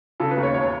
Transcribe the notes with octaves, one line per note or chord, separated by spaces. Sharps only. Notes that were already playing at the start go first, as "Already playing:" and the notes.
C#3 A4
B4
D#2
C#5
E1 C#5